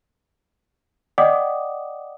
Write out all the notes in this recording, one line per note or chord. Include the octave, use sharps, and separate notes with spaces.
D5 D#5 F#5 G5 D6 D#6